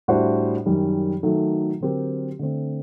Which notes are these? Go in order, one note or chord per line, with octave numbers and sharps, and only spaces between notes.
A2 G3 D4 F#4 C5
F#2 D#3 G3
D#3 F#3 A3 D#4 A4
D3 F#3 C4 G4 A#4
D3 A3 C4